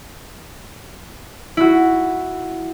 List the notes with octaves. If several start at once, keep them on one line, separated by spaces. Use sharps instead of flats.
E4 F#4